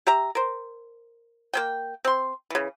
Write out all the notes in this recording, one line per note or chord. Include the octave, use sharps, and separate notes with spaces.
G4 E5 A#5
A#4 C5
A#3 C#4 G5
C4 C6
C#3 E3